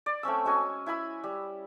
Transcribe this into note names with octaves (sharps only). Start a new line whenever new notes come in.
D5
A3 C4 C#4 E6
G#3 C#4 F#4 G#5
E4 G#5 B5 E6
G3